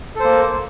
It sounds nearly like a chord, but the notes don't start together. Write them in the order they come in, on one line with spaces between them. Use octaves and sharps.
A4 C5 A#3